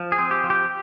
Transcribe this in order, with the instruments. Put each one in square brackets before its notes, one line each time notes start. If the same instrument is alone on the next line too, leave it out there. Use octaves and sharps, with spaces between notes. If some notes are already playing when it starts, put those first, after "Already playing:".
Already playing: [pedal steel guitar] F3
G#4
C4
G4
F3
G4